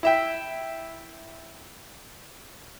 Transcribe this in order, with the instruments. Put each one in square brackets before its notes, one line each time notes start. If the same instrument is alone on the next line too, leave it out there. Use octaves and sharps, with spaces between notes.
[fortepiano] E4 E5 G5